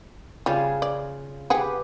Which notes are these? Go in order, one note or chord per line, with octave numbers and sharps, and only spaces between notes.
C#3 G3 F4 G#4
D5
G4 G#4 B4 F#5 G5